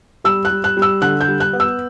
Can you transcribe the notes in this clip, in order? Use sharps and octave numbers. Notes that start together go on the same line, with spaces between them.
G3 E6
F#6
G3
F#6
G3
E6
D3 F#6
G6
G3
F#6
B3
E6